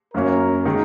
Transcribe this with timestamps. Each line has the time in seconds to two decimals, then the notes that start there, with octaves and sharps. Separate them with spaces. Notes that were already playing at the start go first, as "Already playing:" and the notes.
0.14 F#2 F#3 A#3 C#4 F#4 A#4
0.65 D#3 G#3 D#4